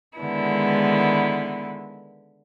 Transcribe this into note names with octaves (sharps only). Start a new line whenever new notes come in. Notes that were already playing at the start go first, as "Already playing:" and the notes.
D3 D#3 G#3 B3 E4